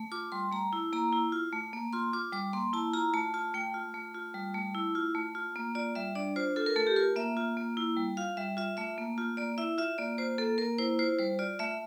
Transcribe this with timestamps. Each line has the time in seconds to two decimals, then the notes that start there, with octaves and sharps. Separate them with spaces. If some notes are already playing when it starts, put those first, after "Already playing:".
Already playing: A3
0.12 F4 D6
0.32 G3 C6
0.51 A3 A#5
0.73 E4
0.93 A#3 A#5
1.13 E4
1.32 F4
1.52 A3
1.73 A#3
1.93 F4 C6
2.13 F4 D6
2.33 G3 D6
2.53 A#3 C6
2.73 E4 A5
2.93 F4 A#5
3.14 A3 A5
3.34 F4 A5
3.54 A3 G5
3.74 F4
3.94 A3
4.14 F4
4.34 G3
4.54 A3
4.75 E4
4.95 F4
5.15 A3
5.35 F4
5.56 A#3
5.75 F4 D5
5.95 G3 E5
6.15 D4 D5
6.36 F4 C5
6.56 F4 A4
6.66 A#4
6.76 A3 A4
6.87 G4
6.96 F4 A#4
7.16 A#3 E5
7.37 F4
7.57 A#3
7.77 E4
7.96 G3
8.17 F4 F5
8.37 G3 E5
8.57 F4 E5
8.77 A3 E5
8.98 A#3
9.18 F4
9.37 A#3 D5
9.58 E4 E5
9.78 F4 E5
9.98 A#3 D5
10.18 F4 C5
10.38 A#3 A4
10.58 A#3 A#4
10.78 E4 C5
10.99 F4 C5
11.19 G3 C5
11.39 F4 D5
11.59 A3 E5